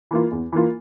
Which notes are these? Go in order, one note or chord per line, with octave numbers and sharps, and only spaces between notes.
E3 A#3 F4
E2
E3 A#3 F4